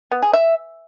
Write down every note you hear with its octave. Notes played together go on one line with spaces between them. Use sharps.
B3
G#4
E5